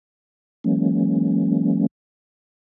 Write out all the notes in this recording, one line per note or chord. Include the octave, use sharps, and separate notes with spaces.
E3 F#3 G#3 A#3 C#4